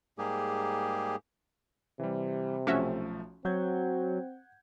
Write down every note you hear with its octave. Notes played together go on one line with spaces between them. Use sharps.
G#2 G3 A#3 G4 G#4
C3 E3 G3
B1 F3 A3 C#4 F#4 E5
F#3 C4 F#5 G6 G#6